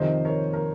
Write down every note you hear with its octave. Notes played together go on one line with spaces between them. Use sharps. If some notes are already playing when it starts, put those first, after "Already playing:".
Already playing: F2 C3 D#3 C5 D#5
A#4 C#5
A#4